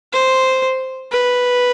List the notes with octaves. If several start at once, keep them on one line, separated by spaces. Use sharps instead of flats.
C5
B4